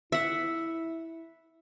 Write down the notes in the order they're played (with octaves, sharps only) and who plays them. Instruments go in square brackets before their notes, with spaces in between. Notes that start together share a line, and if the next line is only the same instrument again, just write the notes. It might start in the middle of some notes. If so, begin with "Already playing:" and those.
[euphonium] E4 [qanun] E5 F#5